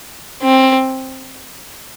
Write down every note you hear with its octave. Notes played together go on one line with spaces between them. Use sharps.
C4